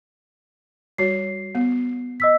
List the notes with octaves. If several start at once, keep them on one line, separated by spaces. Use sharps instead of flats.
G3 F#4 C#5 C7
B3
D#5 E6 B6